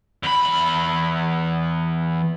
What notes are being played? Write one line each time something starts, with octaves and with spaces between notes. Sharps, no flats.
E2 B5